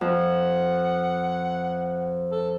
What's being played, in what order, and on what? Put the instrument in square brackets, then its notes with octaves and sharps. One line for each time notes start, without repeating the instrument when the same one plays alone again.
[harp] F2 [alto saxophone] F#5
[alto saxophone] A4